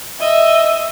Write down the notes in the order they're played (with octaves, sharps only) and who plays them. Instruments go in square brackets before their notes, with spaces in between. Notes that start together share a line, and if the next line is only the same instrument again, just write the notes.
[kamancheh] D#5 E5